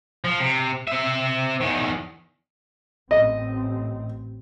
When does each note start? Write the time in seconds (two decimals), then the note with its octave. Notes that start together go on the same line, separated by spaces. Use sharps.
0.24 F3
0.40 C3
0.87 C4 E5
1.61 E2 D#3
3.11 A1 C4 D#5